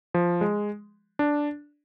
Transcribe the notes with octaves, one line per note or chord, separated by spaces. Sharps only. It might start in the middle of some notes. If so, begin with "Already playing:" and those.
F3
G#3
D4